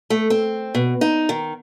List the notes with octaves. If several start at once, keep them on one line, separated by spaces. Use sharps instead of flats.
A3
C4
B2
D#4
D#3